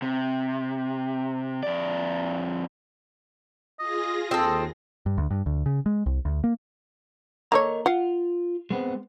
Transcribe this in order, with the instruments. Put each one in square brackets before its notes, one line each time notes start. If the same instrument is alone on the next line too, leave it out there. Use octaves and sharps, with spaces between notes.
[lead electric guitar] C3
F2 D5
[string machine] F4 G#4 A#6 [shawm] D#5
[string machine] D#2 [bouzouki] C4 A4 [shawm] D#5
[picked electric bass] G2
D2
G2
D2
C#3
G#3
C2
D2
A#3
[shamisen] A#3 A4 C#5 [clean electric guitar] A#4 D#5 A#5
[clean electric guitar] F4 [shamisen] F5 F#5
[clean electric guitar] G#3 B3 C4